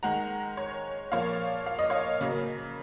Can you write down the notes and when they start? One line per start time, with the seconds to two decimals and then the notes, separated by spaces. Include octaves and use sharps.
0.03 D#3 G#3 F#5 A#5
0.57 C#5
1.12 A#2 F3 A#3 C#5 F5
1.66 F5
1.79 D#5
1.90 C#5 F5
2.21 C#3 F#3 A#3